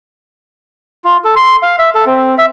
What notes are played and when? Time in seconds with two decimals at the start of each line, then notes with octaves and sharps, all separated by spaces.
1.04 F4
1.24 A4
1.36 C6
1.63 F5
1.79 E5
1.95 A4
2.06 C4
2.38 E5